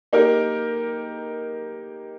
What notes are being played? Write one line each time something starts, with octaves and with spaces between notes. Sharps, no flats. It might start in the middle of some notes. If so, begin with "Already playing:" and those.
A#3 D#4 G4 A#4